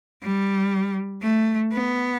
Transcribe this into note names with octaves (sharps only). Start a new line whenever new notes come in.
G3
A3
B3